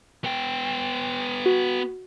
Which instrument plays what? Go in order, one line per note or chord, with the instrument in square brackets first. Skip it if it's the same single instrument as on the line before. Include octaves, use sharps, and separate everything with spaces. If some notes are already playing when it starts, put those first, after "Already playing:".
[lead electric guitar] B3 G5
[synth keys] F#4